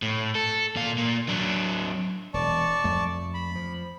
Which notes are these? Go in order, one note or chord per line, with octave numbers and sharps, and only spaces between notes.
A2
A4
A#2 F5
A#2 A#3
F#3 D4
E1 D5 A5 C#6
F2 A3
B5
F3